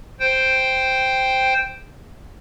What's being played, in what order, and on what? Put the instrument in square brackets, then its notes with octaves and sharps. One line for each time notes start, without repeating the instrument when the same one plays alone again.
[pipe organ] C5 G5